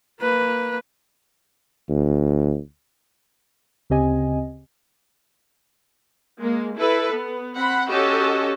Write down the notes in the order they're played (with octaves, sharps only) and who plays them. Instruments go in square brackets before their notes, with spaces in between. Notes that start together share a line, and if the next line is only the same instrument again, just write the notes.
[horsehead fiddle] A#3 B4
[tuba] D2
[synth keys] D2 C#3 C4 G4 D#5 G#5
[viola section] G#3 A#3
E4 A4 B4
B3
C4 F#5 B5
C#4 F#4 G4 A4 D#5